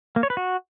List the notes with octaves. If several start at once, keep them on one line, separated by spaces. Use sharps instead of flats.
A#3
C#5
B4
F#4